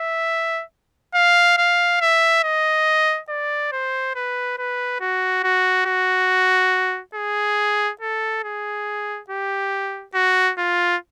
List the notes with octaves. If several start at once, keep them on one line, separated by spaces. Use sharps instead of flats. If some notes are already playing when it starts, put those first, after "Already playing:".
Already playing: E5
F5
F5
E5
D#5
D5
C5
B4
B4
F#4
F#4
F#4
G#4
A4
G#4
G4
F#4
F4